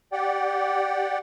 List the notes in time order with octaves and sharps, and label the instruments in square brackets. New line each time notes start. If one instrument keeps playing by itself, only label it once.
[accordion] G4 D5 F#5 G5